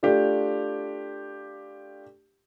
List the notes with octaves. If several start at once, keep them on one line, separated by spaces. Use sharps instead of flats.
A3 D4 F4 G4